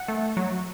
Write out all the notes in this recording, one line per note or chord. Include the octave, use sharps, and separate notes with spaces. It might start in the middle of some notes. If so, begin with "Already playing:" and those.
Already playing: F#5
A3
F#3